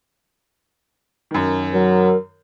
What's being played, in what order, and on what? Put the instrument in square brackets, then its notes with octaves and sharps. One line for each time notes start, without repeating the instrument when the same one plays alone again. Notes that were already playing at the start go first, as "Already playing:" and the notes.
[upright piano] F#2 D#3
[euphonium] F#3 [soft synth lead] A#4